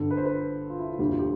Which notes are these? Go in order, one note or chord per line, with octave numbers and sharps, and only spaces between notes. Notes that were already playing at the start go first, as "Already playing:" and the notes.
Already playing: G1 G2 D3 A4
B4
C5
B4
F4
E4
F4
E1 D2 D3 G3 E4
F4
G4